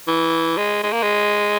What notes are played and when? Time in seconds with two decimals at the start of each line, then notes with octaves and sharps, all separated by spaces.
0.07 E3
0.57 G#3
0.83 G#3
0.92 A#3
1.03 G#3